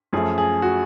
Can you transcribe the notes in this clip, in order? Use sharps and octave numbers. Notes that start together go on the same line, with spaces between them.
F#2 F3 A3 C#4 G#4
G#4
F#4